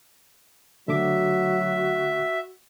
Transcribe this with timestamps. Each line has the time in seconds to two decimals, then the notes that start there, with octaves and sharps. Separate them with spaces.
0.88 D3 F#3 A3 F#4 E5 D6